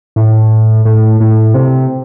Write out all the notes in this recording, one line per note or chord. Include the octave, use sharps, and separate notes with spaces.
A2
A2
A2
C3